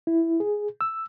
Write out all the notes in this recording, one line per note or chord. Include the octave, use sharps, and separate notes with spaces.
E4
G#4
E6